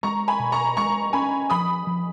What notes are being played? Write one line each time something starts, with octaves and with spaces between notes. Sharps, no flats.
G#3 A#5 C#6
G#5 B5
B2
A#5 C#6
G#3 A#5 C#6
C#4 G#5 B5
F3 B5 D#6
F3